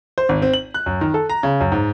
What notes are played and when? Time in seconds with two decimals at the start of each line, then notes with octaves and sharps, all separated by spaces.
0.18 C5
0.29 G#1
0.42 C4
0.54 F#7
0.74 F#6
0.86 F#2
1.01 D#3
1.14 A4
1.29 A#5
1.43 C#3
1.61 F#2
1.72 G#2